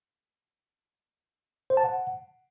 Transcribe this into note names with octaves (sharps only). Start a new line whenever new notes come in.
C5
A5
F#5